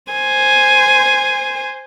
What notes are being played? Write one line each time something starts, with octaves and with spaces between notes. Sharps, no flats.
C5 G#5